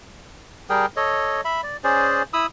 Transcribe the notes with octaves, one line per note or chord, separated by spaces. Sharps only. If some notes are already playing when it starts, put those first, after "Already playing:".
G3 G#4 A#4 G5
A4 C#5 D#5
E5 B5
D5
C#4 G#4 C5 D5
E4 B5 D#6 E6